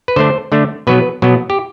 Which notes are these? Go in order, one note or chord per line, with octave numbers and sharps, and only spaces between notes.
B4
D3 A3 D4 C5
D3 A3 D4
B2 F#3 B3 B4
B2 F#3 B3
G4